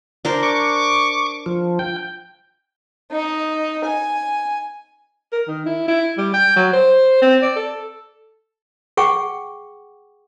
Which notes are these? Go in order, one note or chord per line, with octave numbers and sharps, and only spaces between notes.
D4 A#4 C5
C#6 D6
F3
G5
D#4
G#5
A#4
D#3
E4
E4
G3
G5
F#3
C5
C4
D5
A4
G#4 F#5 G5 C#6 D6